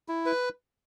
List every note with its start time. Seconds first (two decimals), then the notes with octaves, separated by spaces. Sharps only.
0.09 E4
0.26 B4